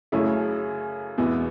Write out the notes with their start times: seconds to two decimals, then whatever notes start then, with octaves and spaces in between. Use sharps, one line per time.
0.12 F#2 C#3 A3 C#4 E4
1.18 E2 B2 B3 E4